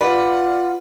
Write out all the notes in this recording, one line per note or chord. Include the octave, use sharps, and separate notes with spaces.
F4 B4 D5 F#5